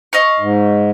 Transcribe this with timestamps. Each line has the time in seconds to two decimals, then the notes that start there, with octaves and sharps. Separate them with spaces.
0.13 D#5 F5 C#6
0.40 G#2